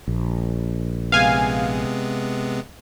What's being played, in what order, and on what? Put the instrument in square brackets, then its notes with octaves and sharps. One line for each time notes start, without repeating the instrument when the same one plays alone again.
[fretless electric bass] A#1
[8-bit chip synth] C3 G#3 B3 [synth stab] F5 G#5